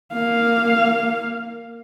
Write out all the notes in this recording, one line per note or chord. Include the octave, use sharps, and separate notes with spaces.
A#3 F5